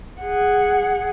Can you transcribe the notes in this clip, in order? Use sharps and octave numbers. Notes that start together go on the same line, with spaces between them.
G#4 F#5